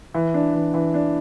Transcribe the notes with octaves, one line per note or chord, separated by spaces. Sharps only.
E3
D4
E3
E3
D4